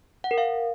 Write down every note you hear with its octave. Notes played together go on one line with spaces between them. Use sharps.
F#5
A#4
F5